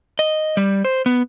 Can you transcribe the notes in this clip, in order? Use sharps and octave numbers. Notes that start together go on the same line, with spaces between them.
D#5
G3
C5
B3